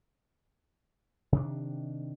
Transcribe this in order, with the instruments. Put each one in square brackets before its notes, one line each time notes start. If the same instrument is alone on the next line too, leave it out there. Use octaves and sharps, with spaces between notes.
[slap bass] C3 D#3 D4